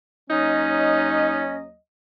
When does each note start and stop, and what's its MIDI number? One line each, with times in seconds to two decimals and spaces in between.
0.30 1.75 39
0.30 1.75 54
0.30 1.64 61
0.30 1.42 63
0.30 1.75 75